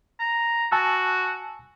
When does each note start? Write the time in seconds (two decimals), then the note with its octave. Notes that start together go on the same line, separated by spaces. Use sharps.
0.20 A#5
0.72 F#4 G#5 A5 E6